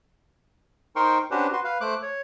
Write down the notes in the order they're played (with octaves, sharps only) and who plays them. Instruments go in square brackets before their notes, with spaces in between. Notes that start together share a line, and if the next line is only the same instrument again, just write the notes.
[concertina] D#4 A#4 C5 G5 C6 C#6
C#4 D4 F#4 G4 B4 C5
F#4 B4 C6
B4 F5
A3 C5 D6 F#6
C#5